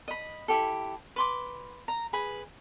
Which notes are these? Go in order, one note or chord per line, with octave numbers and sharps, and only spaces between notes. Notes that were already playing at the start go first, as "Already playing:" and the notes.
D#5 B5
E4 G4 A4
B4 C6 D6
A#5
G#4 B4 B5